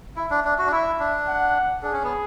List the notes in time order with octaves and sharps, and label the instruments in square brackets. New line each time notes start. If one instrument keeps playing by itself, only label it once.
[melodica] E4 [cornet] E5
[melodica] D4
D4
F#4
D4
[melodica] E4 [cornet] E5
[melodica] D4
[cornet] F#5
[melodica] D4 [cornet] G#4
[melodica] C#4
B3